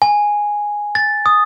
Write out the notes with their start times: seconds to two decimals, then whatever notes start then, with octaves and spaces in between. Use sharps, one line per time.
0.02 G#5
0.95 A6
1.26 D#6